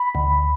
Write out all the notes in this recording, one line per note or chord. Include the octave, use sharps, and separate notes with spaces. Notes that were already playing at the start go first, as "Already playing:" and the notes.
Already playing: B5
D2